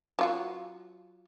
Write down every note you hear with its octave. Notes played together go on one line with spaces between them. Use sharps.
F#3 F4 F#4